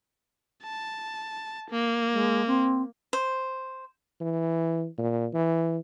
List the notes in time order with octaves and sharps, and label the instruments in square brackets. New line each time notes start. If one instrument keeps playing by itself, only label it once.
[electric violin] A5
A#3
[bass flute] G#3
C4
[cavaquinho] C5
[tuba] E3
A#2
E3